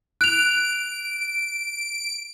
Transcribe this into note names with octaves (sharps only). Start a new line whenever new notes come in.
F#6 D7 F7